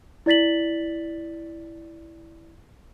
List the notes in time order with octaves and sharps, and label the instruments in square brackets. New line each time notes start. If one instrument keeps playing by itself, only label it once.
[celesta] E4 D5 A6 B6 F#7